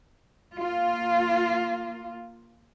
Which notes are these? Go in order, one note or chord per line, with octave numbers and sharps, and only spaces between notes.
A#3 F4